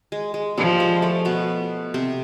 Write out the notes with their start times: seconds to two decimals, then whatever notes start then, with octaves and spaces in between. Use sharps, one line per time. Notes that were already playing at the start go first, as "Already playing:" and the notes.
0.12 G#3
0.34 G#3
0.58 F3 G3
0.80 G#3
1.02 A3
1.25 B2 B3
1.94 C3 C4